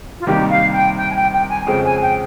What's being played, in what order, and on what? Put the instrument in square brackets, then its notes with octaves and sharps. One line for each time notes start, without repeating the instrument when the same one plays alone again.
[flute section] F4
[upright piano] C3 D#3 G3 A#3 [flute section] G4
[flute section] F5
G5
G5
G#5
G5
G5
G#5
[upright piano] F2 C#3 G#3 C4 [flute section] G5
[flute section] G#5
G5